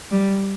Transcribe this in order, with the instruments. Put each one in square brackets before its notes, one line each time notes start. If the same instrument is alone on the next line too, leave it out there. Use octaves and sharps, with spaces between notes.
[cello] G3